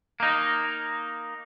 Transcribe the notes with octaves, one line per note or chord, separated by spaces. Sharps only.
A#3 D#4